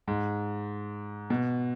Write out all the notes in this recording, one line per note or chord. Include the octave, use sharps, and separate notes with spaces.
G#2
B2